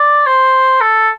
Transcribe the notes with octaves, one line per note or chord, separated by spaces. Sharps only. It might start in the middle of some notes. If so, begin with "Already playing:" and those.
Already playing: D5
C5
A4